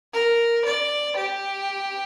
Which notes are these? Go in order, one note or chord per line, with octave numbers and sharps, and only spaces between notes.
A#4
D5
G4